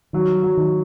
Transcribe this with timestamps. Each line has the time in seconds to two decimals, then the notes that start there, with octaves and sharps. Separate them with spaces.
0.13 D#3 F#3
0.43 F#3
0.57 D#3